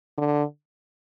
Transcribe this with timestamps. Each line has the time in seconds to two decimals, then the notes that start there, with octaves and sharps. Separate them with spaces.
0.18 D3